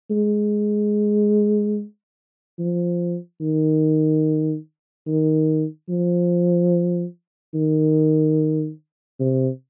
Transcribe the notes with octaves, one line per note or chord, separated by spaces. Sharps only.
G#3
F3
D#3
D#3
F3
D#3
C3